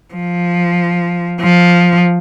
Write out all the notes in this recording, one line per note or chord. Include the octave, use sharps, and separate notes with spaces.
F3
F3